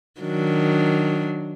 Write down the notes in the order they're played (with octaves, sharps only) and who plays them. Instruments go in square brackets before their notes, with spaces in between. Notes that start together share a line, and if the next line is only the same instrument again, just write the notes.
[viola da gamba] D#3 F#3 D4